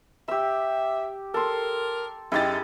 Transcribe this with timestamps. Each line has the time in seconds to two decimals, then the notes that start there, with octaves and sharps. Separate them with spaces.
0.28 G4 E5 E6
1.34 A4 A#4 C6
2.32 F#2 D#4 E4 G4 G#4 A6